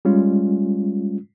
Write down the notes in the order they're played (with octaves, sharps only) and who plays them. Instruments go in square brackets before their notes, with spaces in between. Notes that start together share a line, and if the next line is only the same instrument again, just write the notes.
[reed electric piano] G3 G#3 C#4 F4